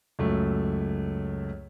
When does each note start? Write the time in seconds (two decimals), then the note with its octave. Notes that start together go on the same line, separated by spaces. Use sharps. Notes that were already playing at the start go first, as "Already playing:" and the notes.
0.19 C#2 F#2 A3